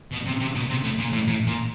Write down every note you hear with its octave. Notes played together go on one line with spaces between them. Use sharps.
B2
C3
C3
B2
C3
A2
A#2
A2
A2
A#2